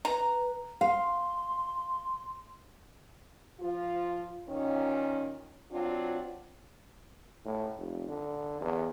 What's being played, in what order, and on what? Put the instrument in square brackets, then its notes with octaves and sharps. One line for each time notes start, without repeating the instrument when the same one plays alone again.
[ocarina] B4 [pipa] A#5
[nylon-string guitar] F5 [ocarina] C6
[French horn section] F3 F4
A#2 D#3 C#4
F#3 C4 D4 F4
[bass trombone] A2
F1
D3
E2